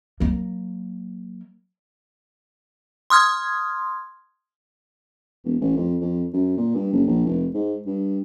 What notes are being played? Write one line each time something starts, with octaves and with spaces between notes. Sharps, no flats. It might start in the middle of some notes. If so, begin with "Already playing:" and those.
F#3 A#3
C6 D#6 F6 G#6
E1
A1
F2
F2
F#2
A#2
G2
F#1
A#1
F1
G#2
G2